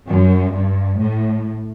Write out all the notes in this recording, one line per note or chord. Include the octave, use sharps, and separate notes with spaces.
F#2
G2
A2